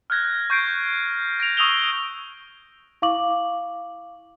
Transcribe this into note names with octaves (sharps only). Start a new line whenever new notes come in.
F6 F#6 G#6 A#6
C#6 G6 C7 D7
A#6 D7 F7
C#6 D#6 E6 F7 G7
E4 F5 C#6 D6 F#7